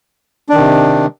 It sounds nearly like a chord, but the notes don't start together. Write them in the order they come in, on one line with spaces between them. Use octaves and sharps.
D4 D#3 C3